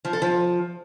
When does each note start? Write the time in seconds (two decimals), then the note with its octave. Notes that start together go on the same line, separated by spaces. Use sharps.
0.05 F3
0.13 A4
0.22 F3